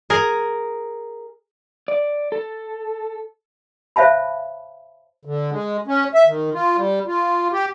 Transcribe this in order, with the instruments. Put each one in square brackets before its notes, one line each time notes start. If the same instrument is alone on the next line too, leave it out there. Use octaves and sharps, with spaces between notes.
[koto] G#4 A#4
[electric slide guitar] D5
A4
[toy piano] C5 C#5 E5 F5 A5 B5
[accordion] D3
G#3
C#4
E5
D#3
F4
G3
F4
G4